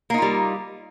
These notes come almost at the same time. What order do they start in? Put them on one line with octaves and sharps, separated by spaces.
A#3 D#4 F4 G3